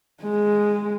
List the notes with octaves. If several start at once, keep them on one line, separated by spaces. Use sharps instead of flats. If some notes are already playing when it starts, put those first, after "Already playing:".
G#3